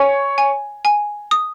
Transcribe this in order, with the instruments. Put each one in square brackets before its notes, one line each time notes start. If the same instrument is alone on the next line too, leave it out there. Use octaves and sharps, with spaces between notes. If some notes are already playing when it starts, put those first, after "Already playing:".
Already playing: [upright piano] C#5 [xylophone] G#5
[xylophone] G#5
G#5
D#6